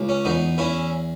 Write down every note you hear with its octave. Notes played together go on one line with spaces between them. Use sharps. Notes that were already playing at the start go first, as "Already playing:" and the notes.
Already playing: C#2
C#4
E2 B3 D#4
E2 C#4 E4